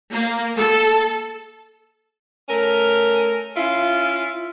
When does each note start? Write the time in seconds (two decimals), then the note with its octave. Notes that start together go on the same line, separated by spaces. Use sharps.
0.12 A#3
0.57 A4
2.49 A3 C#4 A#4
3.56 C#4 E4 F4